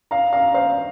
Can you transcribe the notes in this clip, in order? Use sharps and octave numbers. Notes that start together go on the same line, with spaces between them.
F5 A#5
F5 A#5
C5 F5